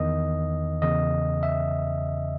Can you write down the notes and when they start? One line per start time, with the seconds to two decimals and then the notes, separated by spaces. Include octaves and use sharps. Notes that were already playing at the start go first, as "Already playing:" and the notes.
Already playing: E2 D#3 D#5
0.82 E2 C#3 E3 D#5
1.43 E5